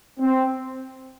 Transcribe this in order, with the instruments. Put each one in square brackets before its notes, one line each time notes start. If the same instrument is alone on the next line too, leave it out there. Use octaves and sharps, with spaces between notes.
[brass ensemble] C4